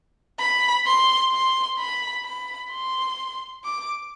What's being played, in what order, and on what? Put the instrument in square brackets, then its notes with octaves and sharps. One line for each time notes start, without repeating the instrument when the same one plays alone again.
[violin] B5
C6
C6
B5
B5
C6
D6